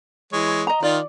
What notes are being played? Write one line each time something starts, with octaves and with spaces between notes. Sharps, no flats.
E3 G#3 C#5
D#5 A#5
D#3 F4 D5